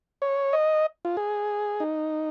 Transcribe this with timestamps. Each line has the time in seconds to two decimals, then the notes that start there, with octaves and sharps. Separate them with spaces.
0.22 C#5
0.53 D#5
1.05 F4
1.17 G#4
1.80 D#4